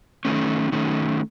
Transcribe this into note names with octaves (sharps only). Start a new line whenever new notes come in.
D#3 A3 C#4
D#3 A3 C#4